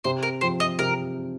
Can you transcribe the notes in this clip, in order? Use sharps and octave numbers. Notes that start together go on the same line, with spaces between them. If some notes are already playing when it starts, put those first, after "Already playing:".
C3 C5
A#4
F3 C4 C5
D#5
C3 A#4